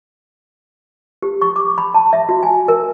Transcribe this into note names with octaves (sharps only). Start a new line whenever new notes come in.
G4
C#6
D6
B5
A5
E5
F#4
G#5
A#4